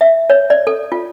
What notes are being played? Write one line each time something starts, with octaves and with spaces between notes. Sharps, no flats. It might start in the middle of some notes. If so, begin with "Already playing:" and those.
E5
C#5
D5
A4
F4